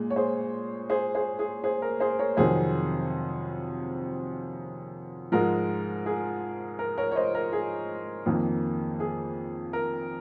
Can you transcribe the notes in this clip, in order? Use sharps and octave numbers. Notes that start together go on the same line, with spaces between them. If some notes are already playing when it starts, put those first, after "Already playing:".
Already playing: A#2 G#3
C#5
G#4 C5
G#4 C5
G#4 C5
G#4
G#4 C5
A#4
G#4 C5
A#4 C#5
F2 C3 D#3 F#3 G#4 C5
G#2 F3 G#3 A#4
G#4
A#4
A#4 C#5
C#5
C5 D#5
A#4
G#4
F2 D#3 A#3
G#4
A#4